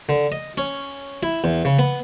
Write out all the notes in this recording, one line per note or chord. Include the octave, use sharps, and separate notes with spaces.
D3
D#5
C#4
E4
E2
C#3
B3